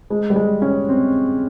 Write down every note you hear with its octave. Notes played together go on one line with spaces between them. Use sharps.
G#3
G3
G#3
C#4
C4